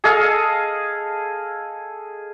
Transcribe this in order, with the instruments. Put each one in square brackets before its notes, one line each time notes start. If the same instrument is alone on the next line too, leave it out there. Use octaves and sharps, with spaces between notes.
[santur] G#4 A4 D#5 F5